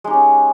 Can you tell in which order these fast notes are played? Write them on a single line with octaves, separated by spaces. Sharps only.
G#3 D#4 G4 C#4